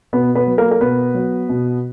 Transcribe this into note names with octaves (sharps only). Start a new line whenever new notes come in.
B2 B3 B4
B3 B4
F#3
A#3 A#4
A#4
B2 B3 B4
F#3
B2